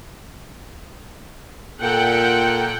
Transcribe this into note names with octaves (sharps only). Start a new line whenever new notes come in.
A#2 A4 F#5 G5